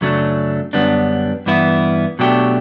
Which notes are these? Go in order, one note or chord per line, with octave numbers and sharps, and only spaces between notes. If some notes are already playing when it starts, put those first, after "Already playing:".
F#2 C#3 F#3 A3 D4
F#2 D3 G3 B3 D4
G2 E3 B3 E4
B2 F#3 A3 D4 G4